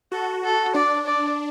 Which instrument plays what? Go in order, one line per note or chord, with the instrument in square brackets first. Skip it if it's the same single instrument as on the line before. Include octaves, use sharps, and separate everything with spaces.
[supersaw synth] F#4 [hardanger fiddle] A4
[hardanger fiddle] A4
[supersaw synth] D4 [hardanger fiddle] D5
[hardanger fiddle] D5